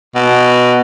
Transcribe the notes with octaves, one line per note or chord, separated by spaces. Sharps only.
B2